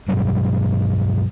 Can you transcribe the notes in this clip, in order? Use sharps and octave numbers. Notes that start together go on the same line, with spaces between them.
G2 B2 F#3 G3